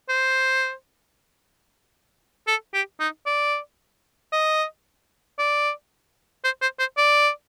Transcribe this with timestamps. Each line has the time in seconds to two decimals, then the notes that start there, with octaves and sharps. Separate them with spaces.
0.09 C5
2.47 A4
2.74 G4
3.00 D#4
3.26 D5
4.32 D#5
5.39 D5
6.44 C5
6.62 C5
6.79 C5
6.97 D5